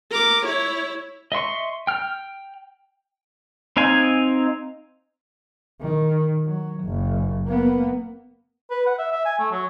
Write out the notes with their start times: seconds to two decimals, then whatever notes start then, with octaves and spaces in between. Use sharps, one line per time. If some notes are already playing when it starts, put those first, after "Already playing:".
0.11 A#4 D6
0.46 E4 C#5
1.32 D#5 E5 C6 C#6
1.87 G5 F6
3.77 C4 D#4 F5 G#5
5.81 D#3
6.45 F#3
6.84 F#1
7.47 A#3 B3
8.70 B4
8.86 F#5
8.99 E5
9.12 E5
9.25 G#5
9.39 A3
9.51 F#3